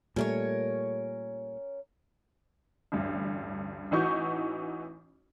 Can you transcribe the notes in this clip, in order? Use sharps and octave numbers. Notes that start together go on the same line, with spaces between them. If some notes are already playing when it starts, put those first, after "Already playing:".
A#2 G3 A3 C#4 A#4 C#5
A1 D2 G2
A1 E3 D#4 F#4 C#6 G6